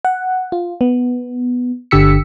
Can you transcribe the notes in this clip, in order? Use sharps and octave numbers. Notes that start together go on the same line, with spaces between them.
F#5
F4
B3
G1 D3 G4 E6 B6 C#7